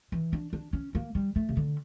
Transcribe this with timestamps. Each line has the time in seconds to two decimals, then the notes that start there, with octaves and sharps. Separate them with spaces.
0.12 E3
0.33 D4
0.53 D4
0.73 C#4
0.95 A#3
1.15 G3
1.36 A3
1.49 C#3
1.57 D3